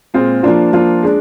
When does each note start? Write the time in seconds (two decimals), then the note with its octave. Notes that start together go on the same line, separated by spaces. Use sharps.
0.14 A#2 G#3 C4 F4 G#4
0.43 F3 A#3 D4 F4
0.73 F3 A#3 D4 F4
1.03 G#3 D4